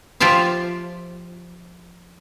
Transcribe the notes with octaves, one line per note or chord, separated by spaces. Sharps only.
F3 F4 G4 E5 F5